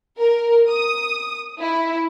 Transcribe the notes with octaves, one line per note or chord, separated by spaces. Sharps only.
A#4
D#6
E4